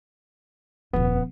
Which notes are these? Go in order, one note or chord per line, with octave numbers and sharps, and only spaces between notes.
D#1 F2 B3